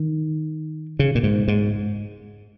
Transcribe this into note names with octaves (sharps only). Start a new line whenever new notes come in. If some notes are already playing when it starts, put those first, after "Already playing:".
Already playing: D#3
C#3
A#2
G#2
G#2